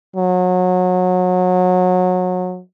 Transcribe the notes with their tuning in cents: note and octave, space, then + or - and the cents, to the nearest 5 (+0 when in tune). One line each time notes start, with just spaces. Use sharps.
F#3 -25